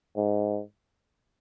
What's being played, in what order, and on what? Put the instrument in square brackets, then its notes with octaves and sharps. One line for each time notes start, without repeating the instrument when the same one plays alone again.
[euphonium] G#2